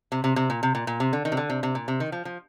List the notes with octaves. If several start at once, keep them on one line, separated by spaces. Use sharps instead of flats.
C3
C3
C3
A#2
C3
A#2
A#2
C3
D3
D#3
C3
D3
C3
C3
A#2
C3
D#3
F3
F3